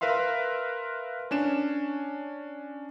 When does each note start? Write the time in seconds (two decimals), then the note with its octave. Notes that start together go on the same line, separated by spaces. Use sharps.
0.01 A#4 B4 E5 F5 C6
1.31 C#4 D4 E7